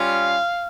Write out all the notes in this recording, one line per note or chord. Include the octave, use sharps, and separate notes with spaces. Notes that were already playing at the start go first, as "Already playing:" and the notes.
Already playing: G3 C#4 F4 F5